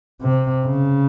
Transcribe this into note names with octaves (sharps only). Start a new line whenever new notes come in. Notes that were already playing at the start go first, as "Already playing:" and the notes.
C3
C#3